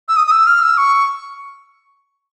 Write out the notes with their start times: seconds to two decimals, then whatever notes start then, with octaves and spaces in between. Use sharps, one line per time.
0.09 E6
0.17 D#6
0.27 D#6
0.31 E6
0.47 F6
0.62 E6
0.78 C#6